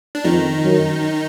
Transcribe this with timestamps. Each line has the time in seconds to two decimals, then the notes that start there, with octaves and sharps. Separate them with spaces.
0.15 D4
0.24 F2 D#3 D#4
0.64 F#2